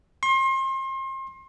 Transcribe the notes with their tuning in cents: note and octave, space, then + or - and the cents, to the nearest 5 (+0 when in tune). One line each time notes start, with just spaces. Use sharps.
C6 +35